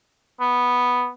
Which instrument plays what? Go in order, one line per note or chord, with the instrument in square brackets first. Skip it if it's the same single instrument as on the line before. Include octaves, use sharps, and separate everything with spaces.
[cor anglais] B3